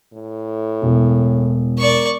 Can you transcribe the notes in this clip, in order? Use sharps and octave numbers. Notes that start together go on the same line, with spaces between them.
A2
E1
A#4 D5 C#6